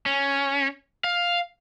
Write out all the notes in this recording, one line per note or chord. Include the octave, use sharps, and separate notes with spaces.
C#4
F5